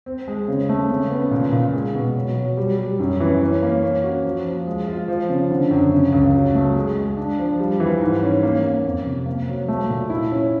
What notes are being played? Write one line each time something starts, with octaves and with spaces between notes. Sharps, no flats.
C4
G#3
C#3
A3
C#3
B3
A#2
A#2
G#3
B2
F#3
F#3
G3
G3
F#2
E3
C#4
A#3
C#4
F#4
F3
F3
G#3
F4
F3
C#3
D3
F#2
C#3
C#2
F#3
A3
G#3
G#3
D4
F3
G3
E3
G#2
C#4
A#3
A#3
F2
C3
A#3
F#3
A3
A#2
E4
C#4